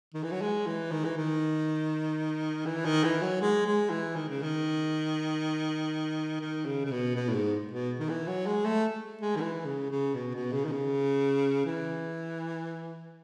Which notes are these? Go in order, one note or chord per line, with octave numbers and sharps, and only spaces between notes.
D#3
E3
F#3
G#3
E3
D#3
E3
D#3
E3
D#3
E3
F#3
G#3
G#3
E3
D#3
C#3
D#3
D#3
C#3
C#3
B2
B2
A2
G#2
B2
D#3
E3
F#3
G#3
A3
G#3
D#3
E3
C#3
C#3
B2
B2
C#3
D#3
C#3
E3